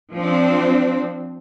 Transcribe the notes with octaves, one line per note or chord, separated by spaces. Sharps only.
F3 C4 D4